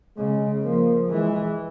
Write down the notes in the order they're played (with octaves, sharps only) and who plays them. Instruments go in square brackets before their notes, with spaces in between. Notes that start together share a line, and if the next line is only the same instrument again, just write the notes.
[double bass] C#3 [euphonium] G#3
[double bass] F3 [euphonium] A#3
[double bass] E3 [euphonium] G#3